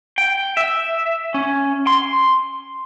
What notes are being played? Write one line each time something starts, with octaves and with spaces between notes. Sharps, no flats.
G5
E5
C#4
C6